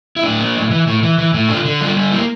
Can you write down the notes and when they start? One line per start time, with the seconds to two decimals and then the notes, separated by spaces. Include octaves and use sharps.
0.16 E4
0.23 A2 D4
0.40 A#3
0.55 A2
0.71 E3
0.87 A2
1.03 E3
1.18 E3
1.34 A2
1.49 D3 D4 F4
1.65 D3
1.81 G3 D4 F4
1.97 D3
2.12 A#3 E4 G4